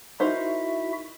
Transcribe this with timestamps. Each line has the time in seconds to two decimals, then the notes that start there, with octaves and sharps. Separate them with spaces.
0.20 D#4 E4 F#4 A#4 C5 E5